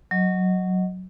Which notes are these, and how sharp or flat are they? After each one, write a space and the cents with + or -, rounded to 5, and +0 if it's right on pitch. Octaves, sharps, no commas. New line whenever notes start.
F#3 +0 D#5 +0